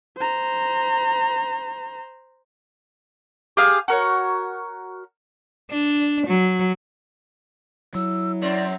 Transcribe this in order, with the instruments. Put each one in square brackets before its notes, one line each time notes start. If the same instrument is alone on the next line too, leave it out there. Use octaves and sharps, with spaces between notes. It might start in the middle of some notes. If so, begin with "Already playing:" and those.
[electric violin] C5 A#5
[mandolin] G4 G#4 F5 D#6
F#4 A#4 C#5
[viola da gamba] D4
F#3
[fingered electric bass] F#3 [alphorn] E4 [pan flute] E6
[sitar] F#2 C4 C#4 [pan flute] D5